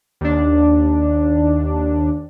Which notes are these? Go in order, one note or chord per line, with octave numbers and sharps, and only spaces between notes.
D#2 D4